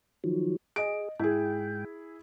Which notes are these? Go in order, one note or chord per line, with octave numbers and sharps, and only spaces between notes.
D#3 F3 F#3
G#4 D#5 D7
G#2 E4 G#4 G5